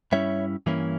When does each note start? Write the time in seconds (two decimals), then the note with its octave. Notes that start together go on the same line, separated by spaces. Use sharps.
0.12 G2 G3 C#4 E4 C#5 E5
0.66 G2 E3 A#3 C#4 E4